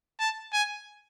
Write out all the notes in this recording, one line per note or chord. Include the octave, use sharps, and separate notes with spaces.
A5
G#5